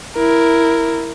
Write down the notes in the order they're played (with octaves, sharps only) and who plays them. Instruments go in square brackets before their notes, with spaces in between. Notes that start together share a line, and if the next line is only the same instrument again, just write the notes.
[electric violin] E4 A#4